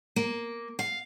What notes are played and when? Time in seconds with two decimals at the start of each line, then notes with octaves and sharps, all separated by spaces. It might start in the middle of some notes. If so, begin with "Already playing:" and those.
0.16 A#3
0.79 F5